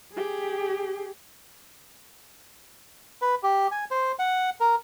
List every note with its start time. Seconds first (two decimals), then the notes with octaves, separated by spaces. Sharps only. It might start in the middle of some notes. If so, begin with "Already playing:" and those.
0.13 G4 G#4
3.22 B4
3.43 G4
3.71 G#5
3.91 C5
4.19 F#5
4.60 A#4